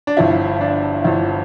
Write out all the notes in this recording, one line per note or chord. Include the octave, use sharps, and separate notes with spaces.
D4
G1 G2 F3 E4
D4
G1 G2 F3 E4